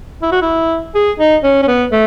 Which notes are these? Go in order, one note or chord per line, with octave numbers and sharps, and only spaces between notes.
E4
F#4
E4
G#4
D#4
C#4
C#4
B3
A3